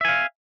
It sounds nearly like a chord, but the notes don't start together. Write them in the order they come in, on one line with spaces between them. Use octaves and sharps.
E5 G#5 F5